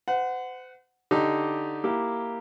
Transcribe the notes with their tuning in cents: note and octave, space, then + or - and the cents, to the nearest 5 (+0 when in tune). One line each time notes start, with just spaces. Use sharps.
C5 -40 F#5 +0
D3 +0 D#4 +0 G4 +0
A#3 +0 E4 +0 G4 +0